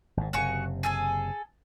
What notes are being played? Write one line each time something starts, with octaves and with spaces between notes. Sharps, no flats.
G#1 G#2
F#1 C3 F#4 G#4 C#6
G#4 A4 G#5